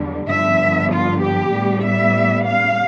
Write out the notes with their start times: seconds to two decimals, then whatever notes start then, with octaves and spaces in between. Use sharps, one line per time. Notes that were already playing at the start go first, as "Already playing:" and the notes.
Already playing: E2 D3 G3
0.28 G2 D3 F3 B3 E5
0.91 F4
1.21 G4
1.52 A2 G3 B3
1.83 E5
2.44 F5